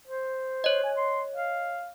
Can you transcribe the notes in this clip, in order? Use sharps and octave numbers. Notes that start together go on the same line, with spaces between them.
C5
C#5 D#5
G#5
C6
F5